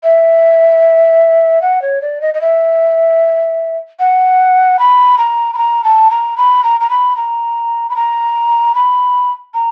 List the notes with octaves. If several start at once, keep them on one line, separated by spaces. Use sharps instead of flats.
E5
F#5
C#5
D5
D#5
D#5
E5
F#5
B5
A#5
B5
A#5
A5
A#5
B5
A#5
A#5
B5
A#5
B5
A#5
B5
A#5